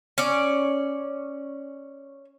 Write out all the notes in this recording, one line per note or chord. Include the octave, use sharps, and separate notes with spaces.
C#4 D5